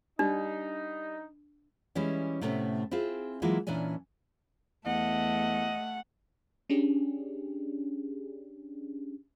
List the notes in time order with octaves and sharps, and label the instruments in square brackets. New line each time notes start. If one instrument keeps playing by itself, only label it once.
[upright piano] G3 [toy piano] D4 [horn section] D#4
[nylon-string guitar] E3 G3 G#3 C#4 E4
A2 C3 A3 B3 C#4
C4 E4 F4 G#4
E3 F#3 G#3 A#3 E4 F4
A#2 E3 C#4 D4 G#5
[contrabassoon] E2 [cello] A3 [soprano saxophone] D#5 [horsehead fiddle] F#5
[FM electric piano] C#4 D4 G4 G#4